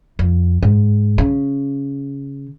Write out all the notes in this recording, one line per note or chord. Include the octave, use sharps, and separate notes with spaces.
F2
G#2
C#3